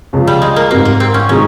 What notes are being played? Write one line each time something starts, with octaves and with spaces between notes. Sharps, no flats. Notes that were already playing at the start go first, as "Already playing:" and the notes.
C#2 C#3 F3 G#3
G3
G#3
A#3
G#2 G3 A#3 C4
A#3
C4
C#4
D#3 G#3 C#4 D#4